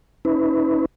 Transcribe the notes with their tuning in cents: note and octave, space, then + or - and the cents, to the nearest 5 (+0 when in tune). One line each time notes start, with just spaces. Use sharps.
C#4 +5 E4 -45 B4 +20